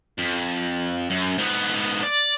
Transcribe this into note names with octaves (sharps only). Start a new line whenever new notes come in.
F2
F#2
G#2 B3
D5